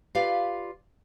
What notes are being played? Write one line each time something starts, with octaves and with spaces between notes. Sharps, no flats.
F4 G4 B4 D5 F5